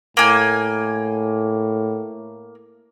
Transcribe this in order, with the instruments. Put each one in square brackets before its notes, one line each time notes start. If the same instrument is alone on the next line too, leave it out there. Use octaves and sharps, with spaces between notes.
[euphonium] A2 [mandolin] A#3 G#5